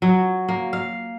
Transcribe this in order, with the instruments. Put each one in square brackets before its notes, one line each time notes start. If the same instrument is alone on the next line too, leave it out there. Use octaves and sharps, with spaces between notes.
[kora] F#3
A#3
F5